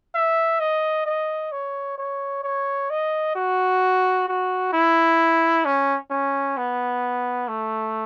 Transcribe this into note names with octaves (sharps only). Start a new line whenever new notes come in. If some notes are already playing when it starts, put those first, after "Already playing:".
E5
D#5
D#5
C#5
C#5
C#5
D#5
F#4
F#4
E4
C#4
C#4
B3
A3